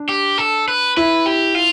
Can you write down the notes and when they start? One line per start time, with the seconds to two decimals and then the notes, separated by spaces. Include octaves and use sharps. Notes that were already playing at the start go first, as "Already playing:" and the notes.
Already playing: D4
0.09 G4
0.38 A4
0.68 B4
0.97 E4 B4
1.26 G4
1.55 F4